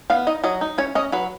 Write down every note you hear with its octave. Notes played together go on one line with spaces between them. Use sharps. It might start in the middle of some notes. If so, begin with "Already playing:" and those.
B3 F5
D#4 D#5
F#3 D#5
D#4
C#4 C#5
C#4 D#5
F#3 B4